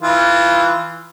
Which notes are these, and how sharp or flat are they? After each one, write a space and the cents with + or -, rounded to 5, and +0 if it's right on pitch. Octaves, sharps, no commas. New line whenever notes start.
E3 -5 F4 -20